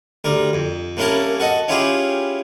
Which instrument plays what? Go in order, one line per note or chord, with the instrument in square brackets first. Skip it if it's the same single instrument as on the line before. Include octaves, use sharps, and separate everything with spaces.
[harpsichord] D2 G3 A#4
F2
C2 A#3 C#4 E4 A#4 A5
F#4 A4 D#5
C#4 E4 F4 G4 G#4